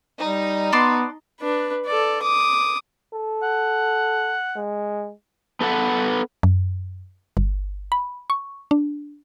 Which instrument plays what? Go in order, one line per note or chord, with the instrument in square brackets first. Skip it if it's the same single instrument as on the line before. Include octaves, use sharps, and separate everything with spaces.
[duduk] G3 [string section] D#4
[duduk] B3 [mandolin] D5 A5 C6
[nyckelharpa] D4 B4
A4 D5
D6 D#6
[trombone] A4
[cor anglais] F#5
[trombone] G#3
[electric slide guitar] B3 A4 B4 D5 F#5
[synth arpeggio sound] F#2
G1
B5
C#6
D4